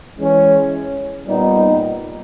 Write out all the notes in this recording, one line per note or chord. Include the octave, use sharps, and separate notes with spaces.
E3 G#3 C#4
A#2 G3 B3 D#4